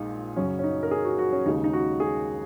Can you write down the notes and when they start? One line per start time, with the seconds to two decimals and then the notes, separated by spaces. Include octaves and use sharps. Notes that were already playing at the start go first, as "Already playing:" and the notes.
Already playing: A#1 A#2 G#3 D#4
0.36 F#2 C#3 F#3 C#4
0.59 C#4
0.64 D#4
0.83 A#4
0.91 G#4
1.05 F#4
1.19 F#4
1.33 C#4
1.45 D#2 C#3 G#3 D#4
1.64 D#4
1.73 F#4
2.00 G#4